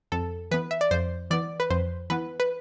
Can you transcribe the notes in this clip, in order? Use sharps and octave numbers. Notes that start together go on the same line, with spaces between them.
F2 A4
E3 B3 B4
E5
D5
F2 C5
E3 B3 D5
B4
F2 C5
E3 B3 B4
B4